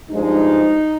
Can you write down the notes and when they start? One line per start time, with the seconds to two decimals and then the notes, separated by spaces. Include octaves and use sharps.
0.10 G2 F3 G#3 D#4